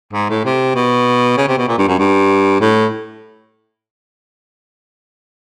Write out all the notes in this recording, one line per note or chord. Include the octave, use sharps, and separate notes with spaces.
G#2
A2
C3
B2
C#3
C3
B2
A#2
G2
F#2
G2
A2